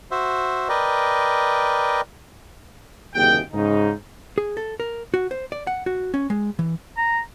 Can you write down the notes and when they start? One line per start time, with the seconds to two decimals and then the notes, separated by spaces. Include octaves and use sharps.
0.11 F#4 C5 E5
0.69 A#4 B4 D5 D#5 G5
3.14 F#1 D#2 C3 G#4 G5
3.52 G#2 C#3 D#4
4.38 G#4
4.57 A4
4.80 A#4
5.14 F#4
5.31 C5
5.52 D5
5.67 F#5
5.86 F#4
6.14 C#4
6.30 G#3
6.59 E3
6.97 A#5